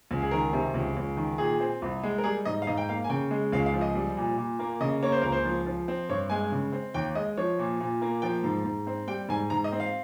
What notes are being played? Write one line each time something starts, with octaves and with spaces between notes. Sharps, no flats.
C#2
G#4
D#3 A#4
C3
C#2
C#2
D#3
A#2 G#4
C4
C2
G#3
A#4
G3 G#4
G#2 D#5
F5
G#2 D#5
G5
A#3 F5
G#5
C#3 G5
G#3
C#2 F5
F5
F3
D#5
G3
A#2
A#2
A#3
C#3 D#5
A#3 C#5
C5
C#2 A#4
C5
F3
F3
C4
G2 C#5
G#3 G#5
C#3
C4
D#2 G5
G#3 D#5
F3 C#5
A#2
A#2
A#3
F3 G5
G#2
G#2
C4
G3 G5
G#2 G#5
G#2 A#5
D#5
C4
F5